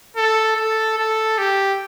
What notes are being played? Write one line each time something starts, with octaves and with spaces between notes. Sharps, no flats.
A4
A4
A4
G4